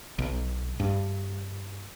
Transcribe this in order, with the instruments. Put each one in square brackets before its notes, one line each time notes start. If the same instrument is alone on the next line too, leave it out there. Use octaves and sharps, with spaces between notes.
[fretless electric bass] B1
G2